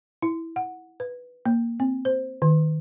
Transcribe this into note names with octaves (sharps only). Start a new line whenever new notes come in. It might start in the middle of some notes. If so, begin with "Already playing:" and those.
E4
F#5
B4
A#3
C4
C5
D#3